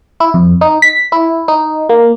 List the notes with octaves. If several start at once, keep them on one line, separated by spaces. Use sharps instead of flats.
E4
F2
D#4
B6
E4
D#4
A#3